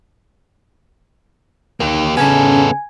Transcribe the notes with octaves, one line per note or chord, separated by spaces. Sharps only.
A#3 D#4 G4
C#3 B3 C#4 A4 G#5 G#6